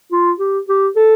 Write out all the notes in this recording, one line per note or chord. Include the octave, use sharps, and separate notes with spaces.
F4
G4
G4
A4